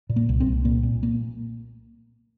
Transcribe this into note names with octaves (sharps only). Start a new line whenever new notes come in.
A#2
A#3
C2
C4
C2
A#2 A#3
A#2
A#3